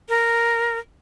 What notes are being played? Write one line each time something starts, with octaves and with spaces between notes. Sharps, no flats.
A#4